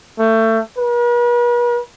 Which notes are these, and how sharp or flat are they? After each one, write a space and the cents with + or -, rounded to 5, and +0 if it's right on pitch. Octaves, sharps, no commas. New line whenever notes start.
A3 +25
B4 -45